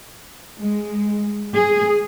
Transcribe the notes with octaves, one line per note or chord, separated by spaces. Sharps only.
G#3
G#4